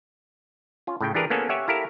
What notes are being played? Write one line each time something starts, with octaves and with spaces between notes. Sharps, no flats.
C#4 F4
A2 C#3 G5
E3 D4 G4 G#4 A#4 B4
A#3 B3 C#4 G#4 A4
G4 C#5 E5 F#5 G#5
E4 G4 A4 A#4 F5